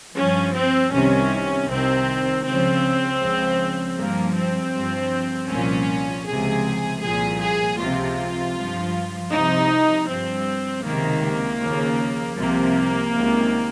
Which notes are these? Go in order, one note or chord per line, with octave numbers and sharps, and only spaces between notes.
G2 F3 C#4
C4
C2 C3 D#3 C#4
C2 C3 D#3 C4
C#2 C#3 F3 C4
C#2 C#3 F3
G2 F3 A#3
C4
G2 F3
C2 A#2 F3 C#4
C#2 C3 F3 G#4
C2 A#2 F3 G#4
G#4
C#2 C3 F3 F4
G2 F3
C2 C3 F3 D#4
G2 F3 C4
C#2 C3 D#3 A#3
D#2 C#3 F3
C2 C3 F3 A#3
C#2 C3 D#3